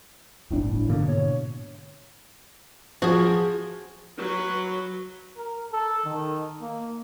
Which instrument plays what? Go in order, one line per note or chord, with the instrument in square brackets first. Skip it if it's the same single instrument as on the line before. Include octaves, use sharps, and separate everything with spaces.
[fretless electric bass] D1 G1 D4 [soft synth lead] A2
[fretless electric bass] G#2 B2 D3 [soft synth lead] A#3
[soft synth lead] C#5
[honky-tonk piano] F3 [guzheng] F#4 G#4
[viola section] F#3 B4
[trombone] A#4
A4
D#3
A#3